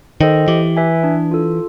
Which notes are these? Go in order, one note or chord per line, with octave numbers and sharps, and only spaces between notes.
D#3 A4 C5 D#5 G5
E3 G4
B4 E5 G#5
D4
F4 A4